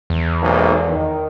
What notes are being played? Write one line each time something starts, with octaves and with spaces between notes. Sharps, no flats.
E2
B1 G#2 A#3
D#3